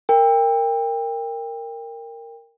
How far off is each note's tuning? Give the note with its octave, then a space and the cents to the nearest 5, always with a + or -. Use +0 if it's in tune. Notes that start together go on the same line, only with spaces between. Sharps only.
A#4 -10 G5 +25